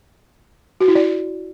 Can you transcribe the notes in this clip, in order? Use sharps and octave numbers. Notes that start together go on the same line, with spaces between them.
F#4
E4
D5